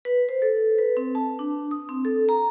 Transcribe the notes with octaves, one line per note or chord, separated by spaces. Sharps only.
B4
C5
A4
B4
C4
A5
D4
D#6
C4
A4
A#5